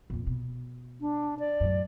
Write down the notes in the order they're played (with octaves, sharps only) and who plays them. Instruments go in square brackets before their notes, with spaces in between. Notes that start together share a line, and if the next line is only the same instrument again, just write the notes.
[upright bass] F2 A#2
B2
[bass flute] D4
D5
[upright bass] F#2 A2